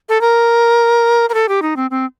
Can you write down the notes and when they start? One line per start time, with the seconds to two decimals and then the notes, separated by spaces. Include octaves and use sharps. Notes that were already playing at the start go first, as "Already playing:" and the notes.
0.09 A4
0.21 A#4
1.29 A#4
1.34 A4
1.49 G4
1.62 D#4
1.76 C4
1.91 C4